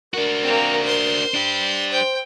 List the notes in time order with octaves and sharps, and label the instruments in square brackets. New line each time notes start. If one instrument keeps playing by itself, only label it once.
[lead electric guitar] D4 F#4 [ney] A#4
[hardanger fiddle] A#3 C4
C5 C6
[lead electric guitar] D4 G4
[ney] C5 [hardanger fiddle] G5